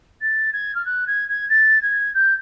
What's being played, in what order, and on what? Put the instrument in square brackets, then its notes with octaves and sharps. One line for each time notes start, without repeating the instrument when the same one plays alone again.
[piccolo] A6
G#6
F6
F#6
G#6
G#6
A6
G#6
G6